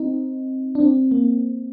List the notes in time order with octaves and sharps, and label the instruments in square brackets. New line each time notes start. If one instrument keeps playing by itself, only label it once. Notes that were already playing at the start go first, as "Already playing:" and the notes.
Already playing: [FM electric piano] C4 D#4
D4
C4
A#3